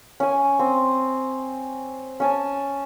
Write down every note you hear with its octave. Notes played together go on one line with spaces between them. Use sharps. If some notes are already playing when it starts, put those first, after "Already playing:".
C#4 G#5
C4
C#4 G#5 A5